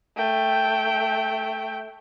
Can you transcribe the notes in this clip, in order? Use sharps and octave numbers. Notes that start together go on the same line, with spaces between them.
A3 G5